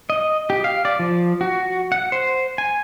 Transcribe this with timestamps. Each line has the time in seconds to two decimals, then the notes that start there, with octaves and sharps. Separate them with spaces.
0.10 D#5
0.50 G4
0.64 F5
0.85 D5
0.99 F3
1.41 F#4
1.92 F#5
2.12 C5
2.58 G#5